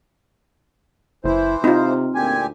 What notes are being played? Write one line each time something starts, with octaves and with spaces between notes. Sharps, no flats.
F#1 E3 E4 C5
C3 C4 D#4 F4
D2 A#2 G4 G#5